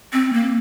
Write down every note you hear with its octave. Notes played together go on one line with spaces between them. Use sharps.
C4
A#3